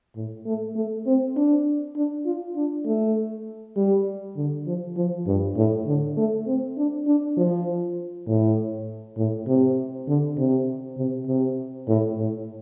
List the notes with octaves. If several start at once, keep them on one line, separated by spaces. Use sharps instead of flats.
A2
A3
A3
C4
D4
D4
F4
D4
A3
G3
D3
F3
F3
G2
A2
D3
A3
C4
D4
D4
F3
A2
A2
C3
D3
C3
C3
C3
A2
A2